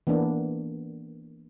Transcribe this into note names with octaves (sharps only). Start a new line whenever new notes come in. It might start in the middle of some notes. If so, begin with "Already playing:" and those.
E3 A#3 B3 D4